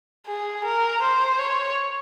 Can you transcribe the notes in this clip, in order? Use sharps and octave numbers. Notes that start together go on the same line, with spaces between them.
G#4
A#4
C5
C#5